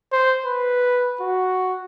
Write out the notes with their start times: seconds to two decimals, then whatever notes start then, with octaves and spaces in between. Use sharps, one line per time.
0.12 C5
0.46 B4
1.21 F#4